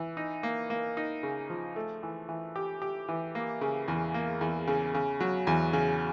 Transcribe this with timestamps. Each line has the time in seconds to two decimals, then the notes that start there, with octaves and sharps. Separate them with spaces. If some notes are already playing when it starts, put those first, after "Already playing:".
Already playing: E3
0.17 D#4
0.43 A#3
0.70 A#3
0.97 D#4
1.23 C#3
1.50 F3
1.76 A3
2.03 E3
2.29 E3
2.56 G4
2.82 G4
3.08 E3
3.35 A#3
3.61 C#3
3.88 E2
4.14 A#3
4.41 E2
4.67 C#3
4.94 C#3
5.20 F#3
5.47 E2
5.73 C#3